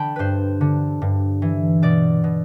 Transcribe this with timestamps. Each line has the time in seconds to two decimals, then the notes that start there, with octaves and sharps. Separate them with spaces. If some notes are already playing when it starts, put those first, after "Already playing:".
Already playing: D3 G5 A5 B5
0.16 G2 B4 C5
0.61 D3
1.02 G2
1.42 E3
1.82 B2 D5
2.24 B2